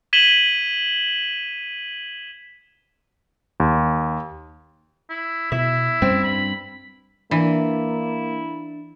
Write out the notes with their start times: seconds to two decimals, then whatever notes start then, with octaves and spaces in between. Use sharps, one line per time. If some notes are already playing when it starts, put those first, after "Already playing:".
0.13 G#6 B6 D#7 E7 F#7 G7
3.60 D#2
5.10 E4
5.52 B2 E4 E5
6.02 F#2 G3 C4 C#4
6.24 G2 B5
7.31 E3 A#3 D4 E4